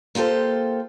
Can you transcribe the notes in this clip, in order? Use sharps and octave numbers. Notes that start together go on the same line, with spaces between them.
A#3 F4 G4 A4 C5